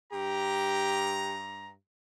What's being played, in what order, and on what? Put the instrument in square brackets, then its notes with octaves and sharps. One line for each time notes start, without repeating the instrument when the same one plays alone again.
[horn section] G2 A#5 [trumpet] G4